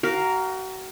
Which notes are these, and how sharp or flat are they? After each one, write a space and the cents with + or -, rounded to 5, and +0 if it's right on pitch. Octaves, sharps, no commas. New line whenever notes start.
F#4 +35 A#4 +0 F5 +0